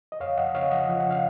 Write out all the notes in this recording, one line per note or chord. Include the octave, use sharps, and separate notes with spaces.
D#5
F2 C#5 F5
F2 D#5 F#5
C#3 C#5 F5
F3 D#5 F#5
F3
F#5
C#3 F5